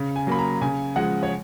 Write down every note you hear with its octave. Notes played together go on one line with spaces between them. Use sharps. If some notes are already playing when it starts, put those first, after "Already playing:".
Already playing: C#3
G#5
F#3 A#3 B5
A#5
C#3 G#5
F3 G#3 F#5
C#5